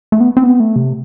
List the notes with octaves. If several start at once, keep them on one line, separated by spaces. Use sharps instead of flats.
A3
B3
C4
B3
A3
C3